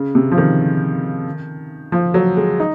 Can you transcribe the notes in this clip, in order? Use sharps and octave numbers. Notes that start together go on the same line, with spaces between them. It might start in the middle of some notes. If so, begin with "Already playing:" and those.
Already playing: C#3
C3
F3
D#3
F3
F#3
G#3
D#4